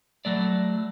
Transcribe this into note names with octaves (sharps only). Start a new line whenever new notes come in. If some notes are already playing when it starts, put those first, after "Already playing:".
F#3 A3 D5